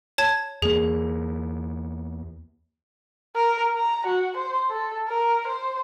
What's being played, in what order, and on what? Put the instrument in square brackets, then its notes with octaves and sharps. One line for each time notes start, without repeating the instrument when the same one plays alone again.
[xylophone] C#5 A5 G#6
[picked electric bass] E2 A#3 [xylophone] G#4
[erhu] A#4
A#5
F#4
C5
A4
A#4
C5